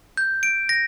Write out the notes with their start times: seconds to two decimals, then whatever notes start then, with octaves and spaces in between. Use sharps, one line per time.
0.17 G6
0.43 D7
0.69 A#6